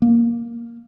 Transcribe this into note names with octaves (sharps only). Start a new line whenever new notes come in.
A#3